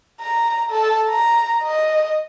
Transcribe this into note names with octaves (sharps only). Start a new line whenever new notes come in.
A#5
A4
A#5
D#5